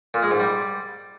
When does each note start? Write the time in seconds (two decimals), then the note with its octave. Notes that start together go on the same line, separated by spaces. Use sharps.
0.14 A#2
0.23 G#3
0.31 G#2
0.40 G3